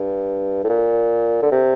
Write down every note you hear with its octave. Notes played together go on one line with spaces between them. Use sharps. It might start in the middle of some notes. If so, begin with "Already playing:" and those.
Already playing: G2
A2
A#2
D3
C3